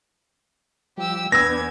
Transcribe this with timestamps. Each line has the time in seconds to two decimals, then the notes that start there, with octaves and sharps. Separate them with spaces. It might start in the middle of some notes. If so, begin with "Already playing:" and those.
0.98 F3 G3 G4 E6
1.32 E2 B3 D4 B4 E6 G#6 A#6